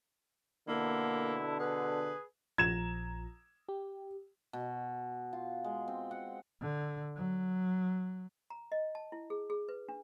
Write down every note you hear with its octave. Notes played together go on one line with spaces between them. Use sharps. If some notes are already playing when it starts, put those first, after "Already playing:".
B2 D3 A#3 E4
G#4 B4
A#1 F3 A#5 G#6 E7
G4
B2
F4
G#3
C4
F#5
D3
F#3
A#5
D#5
A5
E4
G#4
G#4
B4
D4